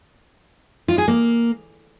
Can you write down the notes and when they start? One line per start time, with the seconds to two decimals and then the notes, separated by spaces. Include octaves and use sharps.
0.88 F4
0.98 G#4
1.08 A#3